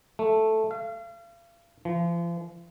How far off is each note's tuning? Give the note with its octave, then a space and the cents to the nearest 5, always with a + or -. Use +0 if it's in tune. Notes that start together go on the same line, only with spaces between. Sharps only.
A3 -5
F5 -40
F3 -40